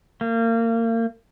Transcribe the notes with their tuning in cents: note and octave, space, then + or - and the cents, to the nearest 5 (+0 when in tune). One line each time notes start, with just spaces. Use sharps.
A#3 -30